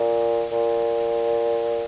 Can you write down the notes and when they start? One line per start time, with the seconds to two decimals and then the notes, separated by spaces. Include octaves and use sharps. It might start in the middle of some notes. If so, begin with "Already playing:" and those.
Already playing: A#2
0.52 A#2